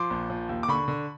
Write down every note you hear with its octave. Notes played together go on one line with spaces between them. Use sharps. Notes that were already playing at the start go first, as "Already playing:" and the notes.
Already playing: F3 C6 D6
A#1
F3
D#2
D6
D3 B5 C#6
D3